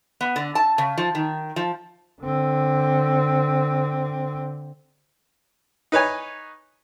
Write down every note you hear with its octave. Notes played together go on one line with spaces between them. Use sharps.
B3
D3
A5
C#3
F3
D#3
F3
D3 C4
D#4 B4 C#5 G#5